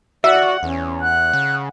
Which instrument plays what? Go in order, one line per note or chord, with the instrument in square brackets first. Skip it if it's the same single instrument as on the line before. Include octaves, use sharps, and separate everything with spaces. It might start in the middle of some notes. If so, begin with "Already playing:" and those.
[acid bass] F#4 [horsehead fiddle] D5 F#5 [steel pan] E5
[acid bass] E2 [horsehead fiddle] C#4
[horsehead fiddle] F#5 [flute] F#6
[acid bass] C#3